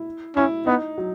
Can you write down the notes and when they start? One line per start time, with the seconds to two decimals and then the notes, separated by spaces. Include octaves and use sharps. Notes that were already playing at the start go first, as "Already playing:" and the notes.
Already playing: E4
0.36 C#4 E4
0.66 B3 D#4
0.98 F#3